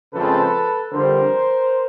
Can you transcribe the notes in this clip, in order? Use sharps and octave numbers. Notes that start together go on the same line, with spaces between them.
F2 C#3 F3 G#3 C4 A4 B4
F2 D3 G3 A#4 C5